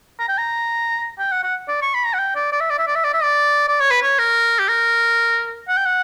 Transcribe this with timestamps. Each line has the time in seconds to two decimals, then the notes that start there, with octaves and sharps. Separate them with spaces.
0.19 A#5
0.29 G5
0.38 A#5
1.19 G5
1.32 F#5
1.43 F#5
1.68 D5
1.82 C#6
1.95 B5
2.06 A#5
2.14 F#5
2.19 G5
2.36 D5
2.52 D5
2.60 E5
2.70 D5
2.79 E5
2.87 D5
2.95 E5
3.04 D5
3.14 E5
3.23 D5
3.68 D5
3.80 C#5
3.91 B4
4.02 C#5
4.19 A#4
4.59 G4
4.69 A#4
5.69 F#5
5.78 G5
5.86 F#5